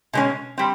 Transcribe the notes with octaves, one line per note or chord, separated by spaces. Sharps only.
B2 G#3 C#4
G3 C4